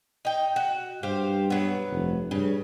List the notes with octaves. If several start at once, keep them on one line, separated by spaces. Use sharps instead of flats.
D#4 G5
F#4
G2 G4 C5 F5
F#3 B3
F1
G2 C#3